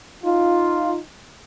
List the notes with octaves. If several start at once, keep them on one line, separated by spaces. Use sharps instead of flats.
D#4 F4